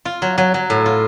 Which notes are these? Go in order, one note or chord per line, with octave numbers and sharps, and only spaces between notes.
F4
F#3
F#3
F#3
A2
F4